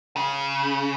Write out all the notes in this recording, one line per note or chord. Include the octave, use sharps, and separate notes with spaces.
C#3